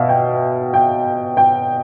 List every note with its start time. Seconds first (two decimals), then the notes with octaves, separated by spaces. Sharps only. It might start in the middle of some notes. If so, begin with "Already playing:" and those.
Already playing: B2 E5 F5
0.09 G5
0.74 G5
1.37 G5